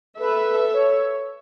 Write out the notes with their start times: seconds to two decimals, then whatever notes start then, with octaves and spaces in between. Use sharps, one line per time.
0.19 A4 B4 E5
0.74 C#5